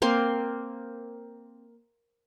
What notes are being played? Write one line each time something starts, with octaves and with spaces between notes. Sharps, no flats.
A#3 C4 C6